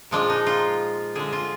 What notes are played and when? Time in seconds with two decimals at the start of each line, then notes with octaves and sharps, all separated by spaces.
0.11 A#2 F3 G#3 D4
0.30 D#4
0.47 F4
1.15 D3 G#3 G#4
1.33 F4